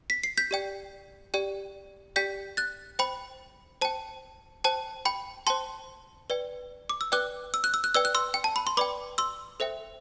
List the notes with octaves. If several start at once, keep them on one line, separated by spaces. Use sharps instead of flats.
B6
C7
G6 B6
G4 D5 G5
G4 D5 G5
G4 D5 G5 G6 B6
F#6 A6
C5 G5 B5
C5 G5 A5
C5 G5 A5
G5 B5
C5 G5 A5 C6
B4 D5 G5
D6
E6
B4 D5 G5 D6 F#6
E6
F#6
E6
F#6
B4 D5 G5 E6
F#6
C6 E6
G5
A5
B5
C6
B4 D5 G5 B5 D6
C6 E6
A4 C5 E5 G5